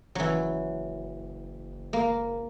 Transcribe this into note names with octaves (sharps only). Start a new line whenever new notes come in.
F#1 E3 F#3
A#3